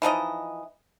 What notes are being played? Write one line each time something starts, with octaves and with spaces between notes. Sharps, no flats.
E3 F3 D#4 D#5